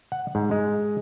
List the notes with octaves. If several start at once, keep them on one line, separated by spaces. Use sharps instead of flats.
F#5
G#2
G#3